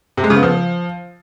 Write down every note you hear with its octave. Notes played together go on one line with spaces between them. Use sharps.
C3
G#3
C#3
B3
F3